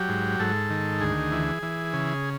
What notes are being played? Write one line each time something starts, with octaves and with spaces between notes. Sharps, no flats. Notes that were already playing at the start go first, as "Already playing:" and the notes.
Already playing: F#3 G4
G#2
G#2 A4
D#3
D2 G#4
E3
E3
C#3